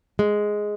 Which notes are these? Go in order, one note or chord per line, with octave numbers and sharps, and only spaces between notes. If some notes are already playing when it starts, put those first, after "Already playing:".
G#3